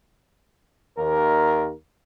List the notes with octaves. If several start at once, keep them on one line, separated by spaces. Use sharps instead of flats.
D#2 A#4